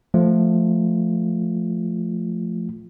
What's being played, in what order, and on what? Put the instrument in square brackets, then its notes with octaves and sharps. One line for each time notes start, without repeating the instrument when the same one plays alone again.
[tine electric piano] F3 A3 F4